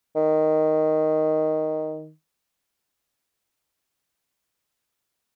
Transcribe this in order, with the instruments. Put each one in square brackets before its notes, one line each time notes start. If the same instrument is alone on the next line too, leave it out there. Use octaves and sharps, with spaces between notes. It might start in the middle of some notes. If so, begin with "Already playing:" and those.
[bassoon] D#3